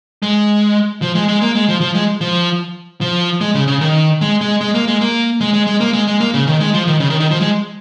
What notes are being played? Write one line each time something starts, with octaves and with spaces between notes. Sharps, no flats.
G#3
F3
G#3
G#3
A#3
G#3
F3
F3
G#3
F3
F3
G#3
C#3
C#3
D#3
G#3
G#3
G#3
A#3
G#3
A#3
G#3
G#3
G#3
A#3
G#3
G#3
A#3
C#3
D#3
G#3
F3
D#3
C#3
D#3
D#3
F3
G#3